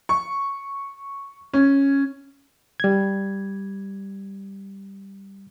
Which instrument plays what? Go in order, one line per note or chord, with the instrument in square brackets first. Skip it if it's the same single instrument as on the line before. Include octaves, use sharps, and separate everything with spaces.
[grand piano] C#6
C#4
[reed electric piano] G3 G#6